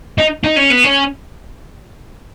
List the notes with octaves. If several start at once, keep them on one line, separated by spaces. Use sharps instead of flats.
D#4
D#4
C#4
B3
C#4